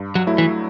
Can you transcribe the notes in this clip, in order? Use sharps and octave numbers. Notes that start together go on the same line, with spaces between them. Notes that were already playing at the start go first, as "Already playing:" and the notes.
Already playing: G2
F#3
F#3 A3 E4
E3